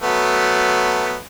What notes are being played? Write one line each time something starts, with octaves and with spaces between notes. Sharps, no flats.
F#3 A3 B3